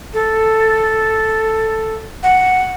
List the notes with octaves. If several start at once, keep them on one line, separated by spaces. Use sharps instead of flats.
A4
F#5